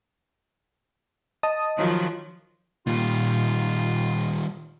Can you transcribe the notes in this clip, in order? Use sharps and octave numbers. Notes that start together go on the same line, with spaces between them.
D#5 A5 D#6
D#3 F3 F#3
A#2 D#3 G3 F4